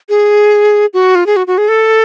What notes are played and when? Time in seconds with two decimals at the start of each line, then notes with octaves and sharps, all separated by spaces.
0.09 G#4
0.94 F#4
1.15 F4
1.26 G#4
1.36 F#4
1.47 F#4
1.58 G#4
1.68 A4